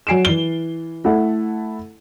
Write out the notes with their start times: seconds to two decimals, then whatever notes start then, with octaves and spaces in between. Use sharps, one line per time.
0.07 F#3 G#5 C7 D7 E7
0.25 E3 G7
1.04 A3 E4 A4 F#5